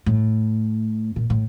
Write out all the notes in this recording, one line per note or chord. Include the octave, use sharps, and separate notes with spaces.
A2
A#2
A2